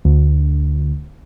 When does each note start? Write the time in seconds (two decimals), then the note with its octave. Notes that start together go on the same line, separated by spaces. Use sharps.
0.05 D2